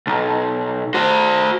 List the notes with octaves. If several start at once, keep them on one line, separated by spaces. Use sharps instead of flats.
B1
F#4 C5